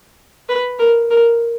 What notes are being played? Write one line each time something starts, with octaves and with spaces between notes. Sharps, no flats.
B4
A#4
A#4